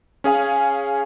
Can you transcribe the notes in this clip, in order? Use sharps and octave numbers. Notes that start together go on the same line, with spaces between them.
C#4 G#4 F5 G#5